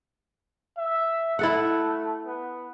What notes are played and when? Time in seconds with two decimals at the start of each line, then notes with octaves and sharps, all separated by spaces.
0.78 E5
1.39 A3 E4 A4 F#5
2.24 B3